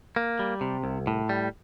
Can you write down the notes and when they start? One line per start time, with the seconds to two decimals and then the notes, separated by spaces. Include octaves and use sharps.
0.16 A#3
0.39 G3
0.61 C3
0.84 C2
1.07 A2
1.29 G3